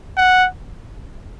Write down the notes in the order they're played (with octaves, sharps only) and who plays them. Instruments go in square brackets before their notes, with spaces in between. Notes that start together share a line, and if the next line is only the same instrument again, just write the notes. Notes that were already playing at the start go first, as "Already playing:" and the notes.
[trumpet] F#5